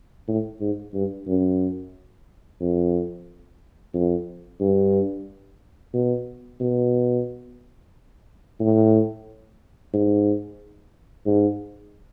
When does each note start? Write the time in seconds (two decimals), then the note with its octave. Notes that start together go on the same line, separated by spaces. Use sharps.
0.28 A2
0.61 G#2
0.94 G2
1.27 F#2
2.61 F2
3.94 F2
4.60 G2
5.93 B2
6.61 B2
8.60 A2
9.94 G#2
11.26 G#2